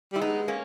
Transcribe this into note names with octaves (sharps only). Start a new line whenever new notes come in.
G3 E4
G#3 B3 D#4
A#3 C#4